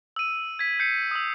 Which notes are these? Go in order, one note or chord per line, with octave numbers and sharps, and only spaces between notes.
E6 D#7
G#6 B6
G6 C7 C#7
D#6 E6